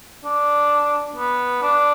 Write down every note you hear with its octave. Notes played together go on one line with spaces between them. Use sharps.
D4
B3
D4